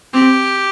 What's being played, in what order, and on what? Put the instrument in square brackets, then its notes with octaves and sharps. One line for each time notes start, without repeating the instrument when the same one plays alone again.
[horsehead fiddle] C4 [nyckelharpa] G4